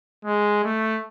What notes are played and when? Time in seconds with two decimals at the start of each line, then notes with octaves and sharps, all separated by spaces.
0.25 G#3
0.64 A3